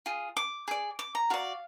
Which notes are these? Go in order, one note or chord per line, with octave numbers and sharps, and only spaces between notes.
F4 G#4
D6
G#4 D5
D6
A#5
F#4 D5 F5